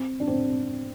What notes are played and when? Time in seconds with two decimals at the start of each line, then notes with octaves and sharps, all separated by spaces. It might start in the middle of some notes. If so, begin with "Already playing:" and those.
Already playing: C4
0.20 D4
0.27 C4